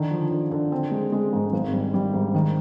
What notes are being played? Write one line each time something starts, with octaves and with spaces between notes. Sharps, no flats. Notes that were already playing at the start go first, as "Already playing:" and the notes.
Already playing: D3 D#3
F3
D3
D3
C4
G#3
G#3
G#2
G#1
G3
G3
G#2
D#3